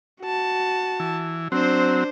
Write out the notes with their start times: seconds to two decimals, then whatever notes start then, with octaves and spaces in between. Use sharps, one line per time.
0.21 F#4 A5
1.00 E3
1.52 F#3 C4 D4 C5